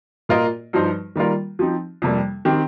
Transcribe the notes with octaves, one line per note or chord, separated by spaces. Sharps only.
A#2 A#3 F4 A#4 D#5
G2 F3 D#4 C5
D#3 G3 A#3 F4 A#4
F3 C4 D#4
F2 C3 G3 A#3
D#3 C4 G4